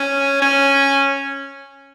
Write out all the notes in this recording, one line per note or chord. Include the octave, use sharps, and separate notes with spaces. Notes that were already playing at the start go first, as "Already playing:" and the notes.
Already playing: C#4
C#4